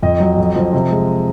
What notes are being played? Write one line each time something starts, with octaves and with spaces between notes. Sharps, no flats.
F2 D#5
F#3
F2
F3
C3
G#3